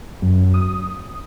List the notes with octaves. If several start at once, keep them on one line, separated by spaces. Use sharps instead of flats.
F#2
D#6